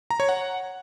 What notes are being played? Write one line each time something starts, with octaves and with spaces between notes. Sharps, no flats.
A#5
C#5
F#5